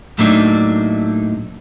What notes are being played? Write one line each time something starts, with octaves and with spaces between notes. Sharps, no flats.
A2 F#3 A3 A#3 D4 D#4